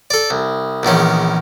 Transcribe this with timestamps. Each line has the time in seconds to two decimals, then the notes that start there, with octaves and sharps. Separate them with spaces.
0.10 A4 D5
0.31 C2
0.83 A#1 E2 D#3 C#4